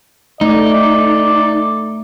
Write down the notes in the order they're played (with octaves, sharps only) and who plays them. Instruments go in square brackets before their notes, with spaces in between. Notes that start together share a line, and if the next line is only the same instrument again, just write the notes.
[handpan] A3 [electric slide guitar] D#4 [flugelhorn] D5